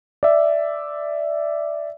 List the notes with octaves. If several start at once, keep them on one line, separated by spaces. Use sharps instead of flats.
D5 E5